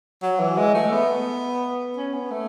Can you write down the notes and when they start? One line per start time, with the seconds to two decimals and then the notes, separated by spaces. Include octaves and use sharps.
0.22 F#3
0.40 E3
0.58 G#3
0.75 A3
0.92 B3
1.97 C#4
2.14 B3
2.31 A3